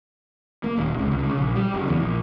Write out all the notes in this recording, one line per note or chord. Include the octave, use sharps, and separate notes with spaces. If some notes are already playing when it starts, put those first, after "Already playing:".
A#3
D#1
C#2
C#2
C#3
A#1
G3
F#1
E2
A#1